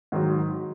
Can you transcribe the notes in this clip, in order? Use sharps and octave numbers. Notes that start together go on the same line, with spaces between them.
G#2 D#3 F#3